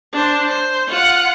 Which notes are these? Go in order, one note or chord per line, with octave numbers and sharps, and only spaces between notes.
D4 C5
C5
F4 F#5